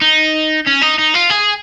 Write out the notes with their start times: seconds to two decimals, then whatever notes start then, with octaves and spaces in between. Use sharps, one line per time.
0.02 D#4
0.66 C#4
0.81 D#4
0.98 D#4
1.14 F4
1.30 G#4